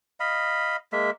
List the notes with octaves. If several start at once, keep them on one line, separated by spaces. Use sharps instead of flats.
D#5 F5 B5
G#3 A#3 E5